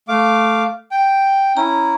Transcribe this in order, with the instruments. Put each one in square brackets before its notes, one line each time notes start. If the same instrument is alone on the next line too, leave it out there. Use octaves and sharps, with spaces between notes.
[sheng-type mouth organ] A3 F5 D6
G5
[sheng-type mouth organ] C#4 E4 [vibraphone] A#5